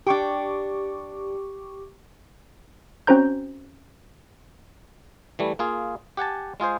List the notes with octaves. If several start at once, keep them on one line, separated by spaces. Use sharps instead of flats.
D4 G4 G5 C#6 D6
C4 C#4 F#4 C5 A#5 G6
E3 G3 A3
A#3 F4 G#4
G4 F#5 G#5 A5
G#3 F4 G#4 C5